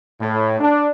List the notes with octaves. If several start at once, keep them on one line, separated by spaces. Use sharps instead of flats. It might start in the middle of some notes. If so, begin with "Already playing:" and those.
A2
D4